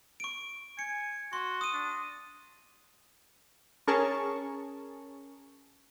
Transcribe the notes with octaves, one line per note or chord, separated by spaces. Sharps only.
C#6 D7
G#5 C#7
F#4 C6
D#6 D#7
D4
C#4 G#4 A#4 A5 C#6